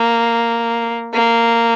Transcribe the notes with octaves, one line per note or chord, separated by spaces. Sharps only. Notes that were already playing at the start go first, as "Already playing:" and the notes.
Already playing: A#3
A#3